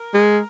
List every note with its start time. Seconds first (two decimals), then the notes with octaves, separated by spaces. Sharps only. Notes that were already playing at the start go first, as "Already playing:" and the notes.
Already playing: A#4
0.14 G#3